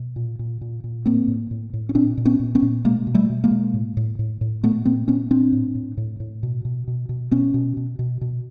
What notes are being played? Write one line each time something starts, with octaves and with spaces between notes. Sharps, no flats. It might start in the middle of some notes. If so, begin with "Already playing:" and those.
Already playing: B2
A#2
A#2
A#2
A#2
A2 A#3 C4
A2
A2
A2
C#4
A#2 C4 D4
A#2
B3 C#4
A#2
B3 C#4
A#2
B2 G#3 A#3
B2
G3 A3
B2
G#3 A#3
B2
A2
A2
A2
A2
A#2 A3 B3
A#2 A#3 C4
A#2 B3 C#4
A#2 C4 D4
A2
A2
A2
A2
B2
B2
B2
B2
B2 B3 C#4
B2
B2
B2
B2